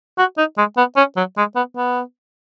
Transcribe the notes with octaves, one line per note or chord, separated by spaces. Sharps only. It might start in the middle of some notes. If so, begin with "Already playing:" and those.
F#4
D#4
G#3
B3
C#4
F#3
G#3
B3
B3